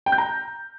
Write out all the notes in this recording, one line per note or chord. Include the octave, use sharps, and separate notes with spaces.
G5
G6
A#5